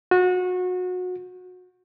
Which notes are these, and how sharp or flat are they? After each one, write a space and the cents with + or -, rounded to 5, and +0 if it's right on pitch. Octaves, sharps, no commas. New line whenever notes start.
F#4 -25